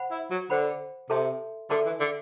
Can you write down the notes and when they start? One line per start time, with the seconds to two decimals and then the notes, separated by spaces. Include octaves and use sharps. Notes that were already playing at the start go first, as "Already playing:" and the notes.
Already playing: C5 F#5 B5
0.11 E4
0.31 F#3
0.50 D3 C5 F#5 B5
1.10 C3 A4 E5 A5 C6
1.70 D3 A4 E5 A5 C6
1.86 E3
2.00 D3